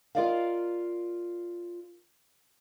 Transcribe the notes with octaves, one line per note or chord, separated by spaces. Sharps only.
F4 F#4 A#4 D5 D#5 F5